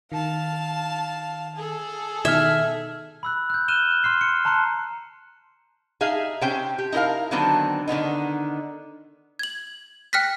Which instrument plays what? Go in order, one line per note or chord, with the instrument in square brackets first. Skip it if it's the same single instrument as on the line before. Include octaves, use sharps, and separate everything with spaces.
[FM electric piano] D#3 [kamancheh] F5 A5
[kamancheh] G#4 A4
[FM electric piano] B2 D#3 D#4 [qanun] E5 [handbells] F6 G#6
[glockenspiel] B5 E6 F#6
F#6 G6
F6 F#6 D#7 E7 G7
C6 F6 C7
C#7
A5 A#5 C6 F#6 C#7
[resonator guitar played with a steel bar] D#4 G#4 E5 F5
C3 C#4 C5 G5
G4
D#4 E4 G#4 A#4 F5
D3 D#3 F#3 B3 C4 D4
D3 D#3 B3 D#4
[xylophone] G#6 F#7
G5 F6 F#6 A#6 B6